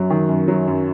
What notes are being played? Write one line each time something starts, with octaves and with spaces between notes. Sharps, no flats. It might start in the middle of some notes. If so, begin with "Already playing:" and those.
Already playing: F#2 F#3
D#3
F#2
F#3
F#2